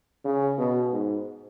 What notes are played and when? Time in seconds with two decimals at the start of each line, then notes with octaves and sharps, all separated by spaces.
0.25 C#3
0.58 B2
0.91 G#2